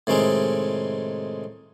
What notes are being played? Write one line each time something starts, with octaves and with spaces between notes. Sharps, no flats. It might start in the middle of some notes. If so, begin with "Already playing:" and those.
A2 C3 D#3 G#3 C4